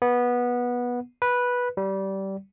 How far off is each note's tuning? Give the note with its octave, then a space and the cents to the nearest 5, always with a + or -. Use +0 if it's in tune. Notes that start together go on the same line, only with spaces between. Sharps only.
B3 -15
B4 -10
G3 -20